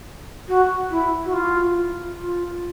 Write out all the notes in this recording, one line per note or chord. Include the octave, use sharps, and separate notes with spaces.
F#4
E4
F#4
F4
F4